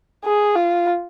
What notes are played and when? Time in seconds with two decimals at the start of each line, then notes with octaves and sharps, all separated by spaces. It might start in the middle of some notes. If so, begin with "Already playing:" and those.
0.24 G#4
0.55 F4